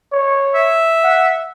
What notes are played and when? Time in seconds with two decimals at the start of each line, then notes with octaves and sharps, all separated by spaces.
0.12 C#5
0.55 E5
1.04 F#5